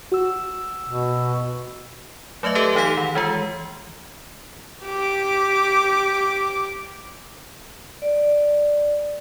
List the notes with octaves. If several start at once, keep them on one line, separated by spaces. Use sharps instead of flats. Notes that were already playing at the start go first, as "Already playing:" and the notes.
F#4 E6
B2
F#3 A3 B4 D#5 E5
G4 A4 B4 E5
E3 D#4 G4 A4 F5 B6
D#3
E3 G#3 F4
G4 D6
D5